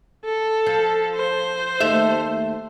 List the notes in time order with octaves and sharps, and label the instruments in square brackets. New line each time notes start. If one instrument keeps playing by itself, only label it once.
[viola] A4
[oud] F3
[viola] C5
[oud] D#2 A3 E5